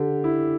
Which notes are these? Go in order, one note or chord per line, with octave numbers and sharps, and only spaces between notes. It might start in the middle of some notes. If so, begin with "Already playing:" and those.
Already playing: D3 G4
E4